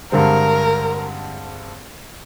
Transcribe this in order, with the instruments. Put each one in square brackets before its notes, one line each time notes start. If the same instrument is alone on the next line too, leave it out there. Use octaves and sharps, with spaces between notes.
[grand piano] G2 D3 G#3 C4 [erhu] A#4